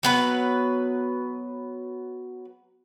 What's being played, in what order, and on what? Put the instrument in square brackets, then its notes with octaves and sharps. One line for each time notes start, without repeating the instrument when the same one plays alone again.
[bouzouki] F#3 B3 B4